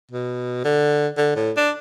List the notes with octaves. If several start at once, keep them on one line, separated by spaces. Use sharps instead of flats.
B2
D3
D3
A2
D4